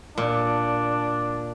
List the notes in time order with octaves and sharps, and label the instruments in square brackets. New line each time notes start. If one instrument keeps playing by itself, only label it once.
[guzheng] A#2 [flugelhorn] D4